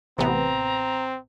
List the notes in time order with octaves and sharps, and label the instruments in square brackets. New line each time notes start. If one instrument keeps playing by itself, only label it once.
[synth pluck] A1 C3 B3 [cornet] C4 [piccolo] A#5